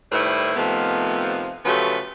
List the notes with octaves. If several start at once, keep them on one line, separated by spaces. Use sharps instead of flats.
A2 D#3 G3 E4 B4 C5
F2 C3 D#3 F3 A3 B3
C#3 F3 F#3 A3 G4 B4